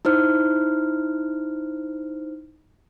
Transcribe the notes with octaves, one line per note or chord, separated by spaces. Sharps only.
D#4 E4 C5 F6